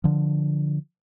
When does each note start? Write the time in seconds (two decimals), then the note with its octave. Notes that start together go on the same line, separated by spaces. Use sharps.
0.04 D3 F3